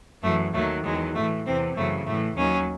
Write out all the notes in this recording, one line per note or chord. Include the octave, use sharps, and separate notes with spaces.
F#2 E3 A3
D#2 D#3 F#3 A3
E2 D#3 F#3 G#3
A2 E3 A3
E2 C3 E3 C4
F#2 C#3 E3 A3
A2 E3 A3
D#2 D#3 F#3 C#4